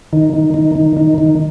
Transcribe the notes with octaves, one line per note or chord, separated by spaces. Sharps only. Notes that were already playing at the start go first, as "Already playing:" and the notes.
D#3
D#3
D#3
D#3
D#3
D#3